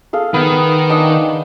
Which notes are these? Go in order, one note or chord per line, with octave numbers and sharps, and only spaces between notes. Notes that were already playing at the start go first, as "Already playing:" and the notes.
G#4 A4 F5
D#3 B3
D4 D#5 G#5